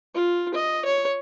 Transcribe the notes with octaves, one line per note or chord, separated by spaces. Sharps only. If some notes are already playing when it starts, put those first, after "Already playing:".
F4
D#5
C#5